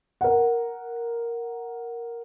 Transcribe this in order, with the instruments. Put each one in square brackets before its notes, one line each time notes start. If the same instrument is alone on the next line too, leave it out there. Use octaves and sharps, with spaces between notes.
[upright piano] A#4 F#5